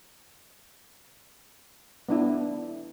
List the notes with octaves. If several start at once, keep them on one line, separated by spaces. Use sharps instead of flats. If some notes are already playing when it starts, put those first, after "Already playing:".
B3 D4 E4